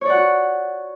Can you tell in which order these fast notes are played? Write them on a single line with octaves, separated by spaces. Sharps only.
C#5 D5 F#5 F#4